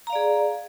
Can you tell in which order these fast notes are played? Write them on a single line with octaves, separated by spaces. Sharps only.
A#5 F5 D5 G#4